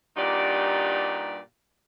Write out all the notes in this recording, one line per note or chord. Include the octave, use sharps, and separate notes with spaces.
G2 A#2 D#4 F#4 G4 D5